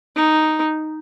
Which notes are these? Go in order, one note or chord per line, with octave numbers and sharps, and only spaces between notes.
D#4